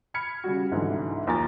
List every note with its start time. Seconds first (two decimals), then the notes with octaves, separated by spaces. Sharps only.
0.14 B5 F6 G#6 C#7
0.44 C#3 G3 F#4
0.71 C2 G#2 D3 E3 F#3
1.27 D#2 F3 G#5 A#5 A6